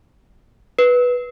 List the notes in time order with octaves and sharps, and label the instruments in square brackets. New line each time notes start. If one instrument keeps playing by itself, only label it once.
[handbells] B4